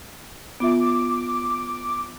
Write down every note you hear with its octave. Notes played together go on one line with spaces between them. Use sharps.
B3 F4 E5 D6